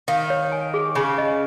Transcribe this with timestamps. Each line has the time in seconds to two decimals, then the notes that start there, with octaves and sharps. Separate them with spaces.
0.08 D#3 F5
0.30 C#5
0.52 G#5
0.74 G#4
0.95 C#3 G#5
1.18 D#5